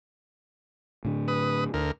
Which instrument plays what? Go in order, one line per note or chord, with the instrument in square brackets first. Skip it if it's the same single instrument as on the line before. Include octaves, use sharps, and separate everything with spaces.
[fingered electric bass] A2 D3
[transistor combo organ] B4 D#6
D2 A#4